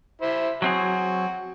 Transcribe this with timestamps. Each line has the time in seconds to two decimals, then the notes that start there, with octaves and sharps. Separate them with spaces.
0.22 E4 C5
0.62 F#3 C4 F#4 G#4